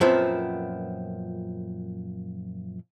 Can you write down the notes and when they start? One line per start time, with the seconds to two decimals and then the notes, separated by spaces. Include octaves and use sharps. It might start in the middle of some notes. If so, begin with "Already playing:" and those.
0.01 F#2 A#2 F3 B3 C4